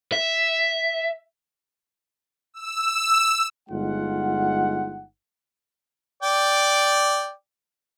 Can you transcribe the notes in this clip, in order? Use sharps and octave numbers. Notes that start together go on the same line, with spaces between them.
E5
E6
G1 G#3 D#4 F4 F#5
D5 G5 D6